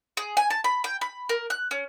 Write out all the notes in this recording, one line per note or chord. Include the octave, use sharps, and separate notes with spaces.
G#4
G#5
A5
B5
G5
B5
A#4
F#6
C#4